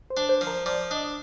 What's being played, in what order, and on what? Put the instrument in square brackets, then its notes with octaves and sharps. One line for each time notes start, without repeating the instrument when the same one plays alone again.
[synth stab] C5
[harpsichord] D4
[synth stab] C5
[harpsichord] F3
[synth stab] A#4
[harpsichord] F3 [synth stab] D5
[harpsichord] D4 [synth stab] D#5